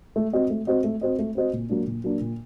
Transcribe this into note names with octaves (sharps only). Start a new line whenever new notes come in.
A3
C4 F#4 C5 D#5
A3
C4 F#4 C5 D#5
A3
C4 F#4 C5 D#5
A3
C4 F#4 C5 D#5
A#2
F#3 A#3 D4
A#2
F#3 A#3 D4
A#2